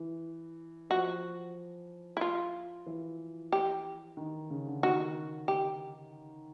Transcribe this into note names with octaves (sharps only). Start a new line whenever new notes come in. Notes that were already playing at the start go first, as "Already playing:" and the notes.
Already playing: E3
F3 F#4
E4
F4
E3
G4
D#3
C#3
D3
D#3 F#4
G4